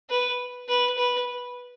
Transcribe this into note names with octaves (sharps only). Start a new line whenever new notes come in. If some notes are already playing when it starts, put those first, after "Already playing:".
B4
B4
B4